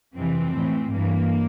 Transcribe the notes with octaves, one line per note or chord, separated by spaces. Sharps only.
F2 C3 E3 C4
A2 E3
G2 E3 A#3